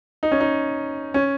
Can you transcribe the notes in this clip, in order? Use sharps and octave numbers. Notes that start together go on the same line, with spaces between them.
D#4
C#4
D#4
C#4